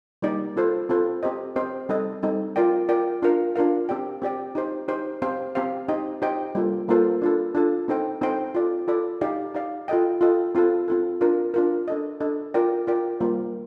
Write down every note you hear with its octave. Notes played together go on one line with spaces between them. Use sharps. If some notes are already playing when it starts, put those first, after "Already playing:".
G3 A#3 D#4 G4 D5
C4 F4 A4 C5
C4 F4 A4 C5
C4 G4 C5 D#5
C4 G4 C5 D#5
G3 C4 D#4 A4 D#5
G3 C4 D#4 A4 D#5
F4 A#4 D5 G5
F4 A#4 D5 G5
D4 F4 A#4 F5
D4 F4 A#4 F5
C4 G4 D5 G5
C4 G4 D5 G5
D#4 G4 C5
D#4 G4 C5
C4 G4 C5 F5
C4 G4 C5 F5
D#4 G4 C5 D#5 G5
D#4 G4 C5 D#5 G5
G3 A#3 F4 A4 C5
G3 A#3 F4 A4 C5
D4 F4 A4
D4 F4 A4
C4 D#4 A4 C5 G5
C4 D#4 A4 C5 G5
F4 A4 D5
F4 A4 D5
D#4 G4 D5 F5
D#4 G4 D5 F5
F4 A4 D#5 G5
F4 A4 D#5 G5
C4 F4 A4
C4 F4 A4
D4 F4 A#4
D4 F4 A#4
D4 A4 D#5
D4 A4 D#5
F4 A#4 D5 G5
F4 A#4 D5 G5
G3 A#3 F4 C5